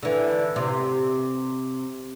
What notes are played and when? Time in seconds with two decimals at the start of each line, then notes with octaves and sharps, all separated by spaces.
0.03 D3 E3
0.56 C3